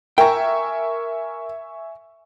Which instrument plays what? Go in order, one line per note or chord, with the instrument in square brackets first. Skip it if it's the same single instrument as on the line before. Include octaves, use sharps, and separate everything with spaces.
[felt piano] A#4 [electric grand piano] E5 G#5 C#6 [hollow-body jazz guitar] G5 A#5